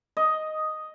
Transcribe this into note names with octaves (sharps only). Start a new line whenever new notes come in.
D#5